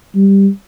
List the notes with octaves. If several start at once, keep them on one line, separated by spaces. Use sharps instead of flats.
G3